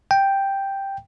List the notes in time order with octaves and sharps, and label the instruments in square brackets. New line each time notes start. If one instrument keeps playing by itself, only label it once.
[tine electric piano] G5